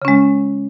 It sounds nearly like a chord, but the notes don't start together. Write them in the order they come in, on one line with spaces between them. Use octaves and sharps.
C#3 C#4 G#3